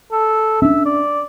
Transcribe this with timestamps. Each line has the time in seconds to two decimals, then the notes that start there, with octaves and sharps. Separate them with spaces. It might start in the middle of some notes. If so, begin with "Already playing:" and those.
0.12 A4
0.62 C#4 D4 E5
0.85 D5